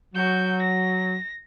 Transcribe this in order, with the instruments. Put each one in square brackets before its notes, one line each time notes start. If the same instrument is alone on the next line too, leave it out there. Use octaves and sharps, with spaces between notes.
[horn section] F#3 [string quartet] F#4 G6
[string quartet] A#6